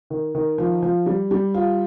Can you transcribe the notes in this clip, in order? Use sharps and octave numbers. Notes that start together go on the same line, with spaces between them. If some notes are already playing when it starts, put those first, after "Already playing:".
D#3
D#3
F3
F3
G3
G3
F4